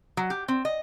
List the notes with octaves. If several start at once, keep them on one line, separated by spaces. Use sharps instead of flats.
F#3
G4
C4
D#5